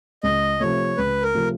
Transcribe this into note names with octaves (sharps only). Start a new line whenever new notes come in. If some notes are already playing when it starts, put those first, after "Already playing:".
C#2 D#5
C3 F3 A3 C#5
C#2 B4
A#4
C3 F3 A3